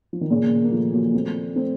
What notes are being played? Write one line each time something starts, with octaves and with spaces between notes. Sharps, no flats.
F3
D#3
A#2 C#3
A#3
F3 A3
F#3 A#3
A3 C4
A3 C4